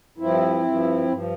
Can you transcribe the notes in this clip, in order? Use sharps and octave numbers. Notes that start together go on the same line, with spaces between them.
G2 F3 C4 E4
G2 F3
G2 F3